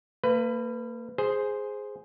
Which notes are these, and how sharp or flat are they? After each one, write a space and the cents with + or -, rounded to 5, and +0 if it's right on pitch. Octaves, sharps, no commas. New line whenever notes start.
A#3 -35 B4 +15
G#4 +0 C5 +0